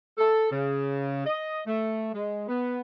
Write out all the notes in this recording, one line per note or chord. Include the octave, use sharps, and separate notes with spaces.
A4
C#3
D#5
A3
G#3
B3